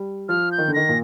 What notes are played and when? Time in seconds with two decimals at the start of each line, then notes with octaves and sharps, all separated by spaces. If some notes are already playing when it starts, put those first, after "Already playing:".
Already playing: G3
0.29 F3 F6
0.52 G6
0.58 D#3
0.68 D3
0.74 D#3 A#6
0.89 A#2